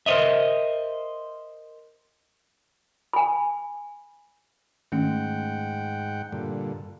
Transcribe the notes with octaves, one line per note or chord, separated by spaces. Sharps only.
A#4 C5 C#5 D#5 E5
G#5 B5
G#2 D#3 A3 C#4 F#5 G5
G2 A#2 D3